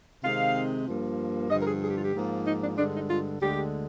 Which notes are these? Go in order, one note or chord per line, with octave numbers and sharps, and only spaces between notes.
C3 D#3 G#3 C4 F5
G2 F3 A#3
G2 D3 F3 D#5
A#4
G#4
G#4
G4
F4
G4
G#2 F3 A#3
D#4
D4
G2 D3 G#3 D4
D#4
F4
D2 D3 G#3 G4